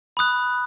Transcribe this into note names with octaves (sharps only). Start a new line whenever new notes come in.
B5 D#6 F#6